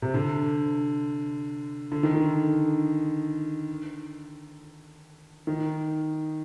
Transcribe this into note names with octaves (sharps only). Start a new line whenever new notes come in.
C3
D3
D3
D#3
D3
D#3